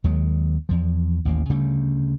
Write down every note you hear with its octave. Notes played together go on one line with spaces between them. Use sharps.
D#2 D#3 F#3 G#3
E2 F3
A1 D#2 A#3
D2 C#3 G3 A3